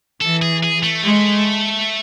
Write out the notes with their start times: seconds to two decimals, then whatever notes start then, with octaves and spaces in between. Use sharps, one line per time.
0.21 E3 A4
0.42 G#4
0.63 G#4
0.83 A3
1.03 G#3